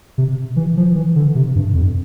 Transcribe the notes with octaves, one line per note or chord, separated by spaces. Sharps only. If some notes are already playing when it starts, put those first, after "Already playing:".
C3
E3
F3
E3
D3
C3
G2
F2